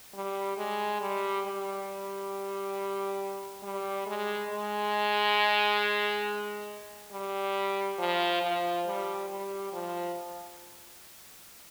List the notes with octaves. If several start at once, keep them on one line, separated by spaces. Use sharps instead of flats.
G3
G#3
G3
G3
G3
G#3
G#3
G3
F3
F3
G3
G3
F3